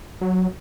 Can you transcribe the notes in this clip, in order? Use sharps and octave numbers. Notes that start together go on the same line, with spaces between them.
F#3